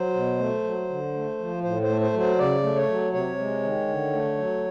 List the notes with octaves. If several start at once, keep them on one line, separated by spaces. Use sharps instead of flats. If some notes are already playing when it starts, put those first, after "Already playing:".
Already playing: F#3 C5
B2
A3
F#3
D3
A3
F3
A2 C5
C5
A3
C5
F#3
C5
C#3 D5
A3
C#5
F#3
C3 C#5
G#3
D#3
D3
A3
F#3